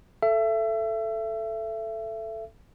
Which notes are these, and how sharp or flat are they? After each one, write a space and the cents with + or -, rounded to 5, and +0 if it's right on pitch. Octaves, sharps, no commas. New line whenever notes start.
A4 +0 E5 +30